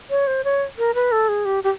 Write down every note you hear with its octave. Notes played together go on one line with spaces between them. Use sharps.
C#5
C5
C#5
A#4
B4
A4
G#4
G4
G4